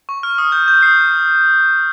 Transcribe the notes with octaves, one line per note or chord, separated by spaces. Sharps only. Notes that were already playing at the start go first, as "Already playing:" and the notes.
C#6
F6
D#6
G6
G6
D#6 C7